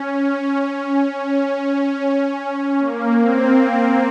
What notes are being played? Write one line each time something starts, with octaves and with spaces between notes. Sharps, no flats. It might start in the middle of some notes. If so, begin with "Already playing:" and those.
Already playing: C#4
C#4
A#3
C4
C4